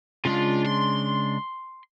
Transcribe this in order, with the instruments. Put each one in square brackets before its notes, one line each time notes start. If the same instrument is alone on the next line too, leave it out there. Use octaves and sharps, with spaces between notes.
[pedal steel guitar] C#3 G#3 D4 [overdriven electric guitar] F4
[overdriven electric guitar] C6